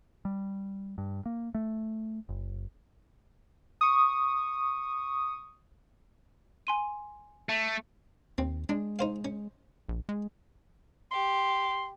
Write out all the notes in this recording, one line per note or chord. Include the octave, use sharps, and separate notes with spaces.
G3
G2
A#3
A3
F#1
C#6 D#6
G#5 C6 D#7
A3
D#2 C4
G#3 D4
D#4 C5 F5
C#4
A#1
G#3
G4 C6